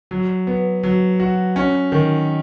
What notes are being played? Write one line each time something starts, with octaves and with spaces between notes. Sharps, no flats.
F#3
B3
F#3
F#4
C#4
D#3